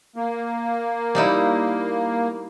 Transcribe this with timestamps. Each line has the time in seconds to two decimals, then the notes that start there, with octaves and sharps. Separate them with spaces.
0.16 A#3
1.15 G3 D#4 E4